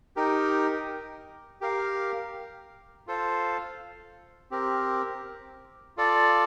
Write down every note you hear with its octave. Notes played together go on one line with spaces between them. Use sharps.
D#4 G4 A#4
G4 A#4 F5
F4 A4 C5 F5
C4 G4 A#4
F4 A4 D5